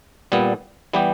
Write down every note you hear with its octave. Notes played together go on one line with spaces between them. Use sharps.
A#2 G3 B3
E3 G3 B3 G4